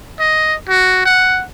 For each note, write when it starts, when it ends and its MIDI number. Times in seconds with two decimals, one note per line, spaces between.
0.20 0.54 75
0.69 1.04 66
1.05 1.43 78